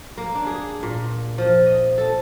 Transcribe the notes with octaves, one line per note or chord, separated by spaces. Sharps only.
A#3
D4
G#4
A#2
F3
D#5
A4